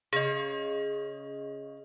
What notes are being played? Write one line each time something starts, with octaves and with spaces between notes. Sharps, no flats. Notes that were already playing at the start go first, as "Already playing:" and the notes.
C#3 G#4 D#5